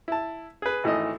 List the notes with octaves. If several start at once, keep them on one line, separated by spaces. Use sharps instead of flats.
E4 A5
G#4 B4
G#1 E3 A3 D#5 D#6